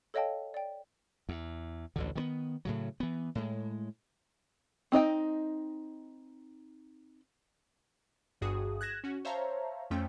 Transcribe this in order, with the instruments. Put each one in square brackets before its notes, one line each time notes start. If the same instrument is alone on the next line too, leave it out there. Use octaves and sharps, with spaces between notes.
[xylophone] A4 C#5 D#5 F5 G5 A5
D5 G5
[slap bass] E2
A1 D2 D3
D#3 G3 B3
A2 C#3 F#3
E3 B3
A2 G#3
[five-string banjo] C4 D#4 D#5 G5
[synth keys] G1 G2 F#4 G#4 D#6
F#6 G#6 A#6 E7
C#4 F#4
C5 C#5 E5 F5 A5 A#5
F2 F3 A3 C#4 G5